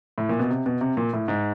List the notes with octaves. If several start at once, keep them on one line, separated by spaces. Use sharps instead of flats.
A2
A#2
B2
C3
B2
C3
A#2
A2
G#2